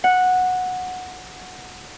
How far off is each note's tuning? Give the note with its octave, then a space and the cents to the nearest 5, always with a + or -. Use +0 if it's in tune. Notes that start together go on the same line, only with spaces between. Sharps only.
F#5 -10